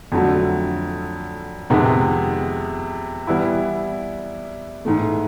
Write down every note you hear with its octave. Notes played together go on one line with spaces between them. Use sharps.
F2 D3 F#3 A3
F2 C3 D#3 G#3 B3
E3 G3 B3 E4
G#2 E3 A3